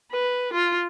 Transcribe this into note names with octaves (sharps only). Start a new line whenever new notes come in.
B4
F4